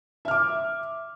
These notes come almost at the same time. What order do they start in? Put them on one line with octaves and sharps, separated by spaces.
E5 F6 D6